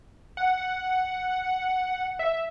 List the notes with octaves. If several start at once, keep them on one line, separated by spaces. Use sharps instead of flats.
F#5
F#5
E5